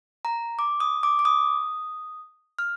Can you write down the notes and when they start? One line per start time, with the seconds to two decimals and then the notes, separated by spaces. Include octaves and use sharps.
0.25 A#5
0.59 D6
0.80 D#6
1.03 D6
1.19 D6
1.25 D#6
2.59 F6